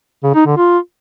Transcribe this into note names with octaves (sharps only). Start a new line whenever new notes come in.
C#3
D#4
D3
F4